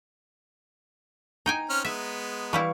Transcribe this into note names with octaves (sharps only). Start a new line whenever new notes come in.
D#4 G5 G#5 A#5
C4 C#4 F6
G#3 B3 E5
E3 G3 E4 F5 B5 C#6